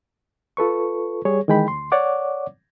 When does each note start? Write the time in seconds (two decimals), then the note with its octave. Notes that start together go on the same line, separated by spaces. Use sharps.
0.57 F4 A4 B4 C#6
1.25 G3 G#4 C#5
1.48 D#3 E3 G#3 G5 B5
1.67 D2 C6
1.92 C#5 D5 F#5 D6